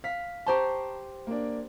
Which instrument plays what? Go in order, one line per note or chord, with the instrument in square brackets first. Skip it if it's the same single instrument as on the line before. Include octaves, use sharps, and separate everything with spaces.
[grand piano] F5 [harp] B6
[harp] G4 C5 C6 [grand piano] A5 A#5 C#6
[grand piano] A#3 D4